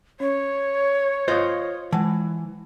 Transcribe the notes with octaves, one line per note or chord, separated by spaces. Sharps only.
C#4 C#5
F4 C5 D#5
E3 G#3 A5